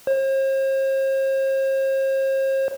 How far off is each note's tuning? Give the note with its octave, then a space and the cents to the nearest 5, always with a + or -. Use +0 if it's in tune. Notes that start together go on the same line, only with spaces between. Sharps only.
C5 +45